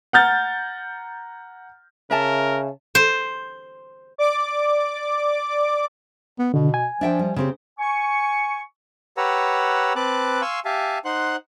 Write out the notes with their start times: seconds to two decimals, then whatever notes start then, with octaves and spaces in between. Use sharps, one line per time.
0.13 F#5 A#5 F6 G6 A6
2.11 C#3 A#4 E5 A5
2.95 C5
4.18 D5 D6
6.39 B3
6.54 B2 D3
6.74 G#5
7.01 F3 D4 E5 G5
7.19 G3
7.36 C#3 C4 G4
7.79 G#5 C#6
9.17 G4 B4 C#5 F#5 A#5 E6
9.96 C4 B4 A5 D6 F#6
10.42 F5 G#5 C6 C#6 E6
10.65 G4 E5 F5 G#5 A5
11.05 D#4 C5 F#5 C6 F#6